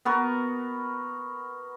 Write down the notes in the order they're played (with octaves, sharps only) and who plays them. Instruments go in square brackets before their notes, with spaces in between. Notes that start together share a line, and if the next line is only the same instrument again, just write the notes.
[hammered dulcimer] B3 F#4 A#4 B4